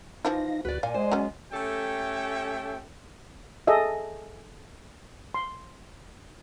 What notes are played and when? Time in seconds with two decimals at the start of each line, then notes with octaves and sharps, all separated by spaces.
0.25 E3 F3 D#4 F4 F5 A#6
0.65 D2 F#4 B4 D5 F#6
0.83 A#2 D5 F5 G#5
0.94 G#3 C5
1.12 F#3 B3 C#4
1.53 A3 C#4 G4 A4 E5 G5
3.67 G#4 A4 D#5 E5
5.34 C6